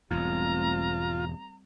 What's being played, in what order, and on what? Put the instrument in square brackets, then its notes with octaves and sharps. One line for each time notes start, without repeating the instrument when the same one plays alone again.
[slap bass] E1 E2 G#2 [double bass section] G3 A3 C4 [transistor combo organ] F4 [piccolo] A#5